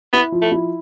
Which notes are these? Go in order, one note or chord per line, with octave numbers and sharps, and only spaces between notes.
B3 E4
F3
A3
E4